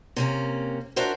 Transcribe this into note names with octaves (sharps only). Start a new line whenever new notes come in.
C3 A#3 C#4
D4 F#4 A#4 C5 E5